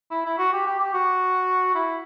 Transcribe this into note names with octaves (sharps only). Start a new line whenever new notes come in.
E4
E4
F#4
G4
G4
G4
F#4
E4